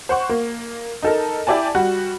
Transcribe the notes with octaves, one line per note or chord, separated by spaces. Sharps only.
C5 F#5 C#6
A#3
D#4 A4 A#4
E4 G4 D5 G#5 A5
G3 F#4